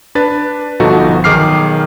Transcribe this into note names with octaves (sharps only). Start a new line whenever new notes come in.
D4 B4 A6
G1 B2 F3 D#4 F#4 A4
B1 D#3 G#4 D6 F6 C7